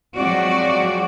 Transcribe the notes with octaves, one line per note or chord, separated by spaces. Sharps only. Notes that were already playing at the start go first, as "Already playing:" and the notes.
F3 F#3 G#3 C4 F#4 D5